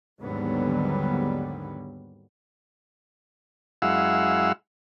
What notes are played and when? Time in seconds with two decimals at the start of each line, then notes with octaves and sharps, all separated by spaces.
0.19 D#2 G#2 D3 F#3 G3 B3
3.82 F#2 G#3 E4 F5 F#5 E6